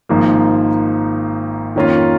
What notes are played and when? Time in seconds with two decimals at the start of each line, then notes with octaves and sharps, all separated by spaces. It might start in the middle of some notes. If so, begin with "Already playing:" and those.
0.09 G#1 G#2 F3 A#3
1.75 F2 D#3 A#3 C#4 F4